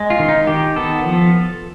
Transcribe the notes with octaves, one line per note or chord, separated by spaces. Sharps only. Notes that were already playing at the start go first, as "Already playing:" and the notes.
Already playing: G#3
F4
D#3
D#4
D#3 G4
B3 A4
F3